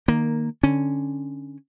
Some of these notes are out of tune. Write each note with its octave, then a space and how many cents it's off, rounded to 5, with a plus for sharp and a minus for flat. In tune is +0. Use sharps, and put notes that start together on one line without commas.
D#3 -15 A#3 +0
D3 +0 C#4 -5